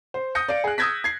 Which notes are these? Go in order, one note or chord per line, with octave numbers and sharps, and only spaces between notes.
C5
D#6 G6 A#6 C#7
D5 F5 D7
G#4 F#6
D#6 E6 G6 G#6 A#6 B6
G#6 C7